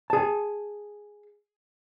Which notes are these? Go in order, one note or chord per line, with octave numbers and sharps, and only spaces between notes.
G#4 A5